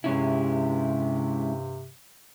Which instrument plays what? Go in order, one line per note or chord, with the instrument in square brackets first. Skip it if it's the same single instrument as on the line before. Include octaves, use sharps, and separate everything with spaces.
[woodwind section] G2 C3 [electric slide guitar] G#3 C#4 E4